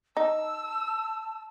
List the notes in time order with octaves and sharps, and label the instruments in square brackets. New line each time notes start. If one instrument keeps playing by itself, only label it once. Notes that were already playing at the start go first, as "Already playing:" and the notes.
[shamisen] D#4 [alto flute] A5 [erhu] E6